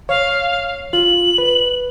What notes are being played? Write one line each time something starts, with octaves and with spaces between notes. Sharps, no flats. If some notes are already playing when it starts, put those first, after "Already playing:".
C#5 F5
F4 F#7
B4